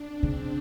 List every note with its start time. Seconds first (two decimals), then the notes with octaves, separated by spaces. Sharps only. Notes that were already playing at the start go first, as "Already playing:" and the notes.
Already playing: D4
0.08 C4
0.23 C#3